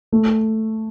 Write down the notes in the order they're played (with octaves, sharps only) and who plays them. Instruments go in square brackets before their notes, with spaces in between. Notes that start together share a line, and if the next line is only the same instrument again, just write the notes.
[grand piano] A3